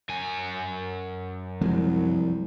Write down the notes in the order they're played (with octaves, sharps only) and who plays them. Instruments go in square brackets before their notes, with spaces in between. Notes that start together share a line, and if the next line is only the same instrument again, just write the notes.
[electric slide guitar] F#2 G#5
[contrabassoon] C2 [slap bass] F3 F#3 G#3